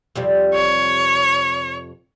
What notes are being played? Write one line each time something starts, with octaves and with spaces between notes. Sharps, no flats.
F2 C3 G3
C#5